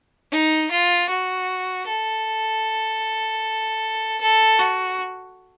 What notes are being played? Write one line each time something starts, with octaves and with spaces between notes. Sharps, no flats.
D#4
F4
F#4
A4
A4
F#4